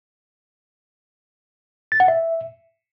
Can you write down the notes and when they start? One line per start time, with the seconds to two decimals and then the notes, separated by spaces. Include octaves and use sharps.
1.92 A6
2.00 F#5
2.08 E5